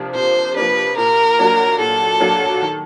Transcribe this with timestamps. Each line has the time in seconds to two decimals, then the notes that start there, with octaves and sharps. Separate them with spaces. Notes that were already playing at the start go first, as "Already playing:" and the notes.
Already playing: C3 F3 A#3 D4
0.14 C3 C5
0.56 F3 A#3 D4 B4
0.97 A#2 A#4
1.39 F#3 A#3 D4 F#4
1.79 A#2 A4
2.20 F#3 A#3 D4 F#4
2.61 D#3